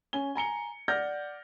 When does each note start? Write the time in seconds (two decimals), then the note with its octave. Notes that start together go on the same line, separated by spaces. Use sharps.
0.13 C#4 G#5 G7
0.35 G#5 A#5 C#7 G7
0.88 D5 F#5 F6 G6 A#6